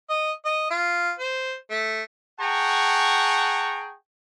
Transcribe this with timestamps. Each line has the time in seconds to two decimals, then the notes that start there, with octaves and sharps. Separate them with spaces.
0.10 D#5
0.45 D#5
0.70 F4
1.19 C5
1.70 A3
2.40 G#4 F#5 G5 A5 A#5 C#6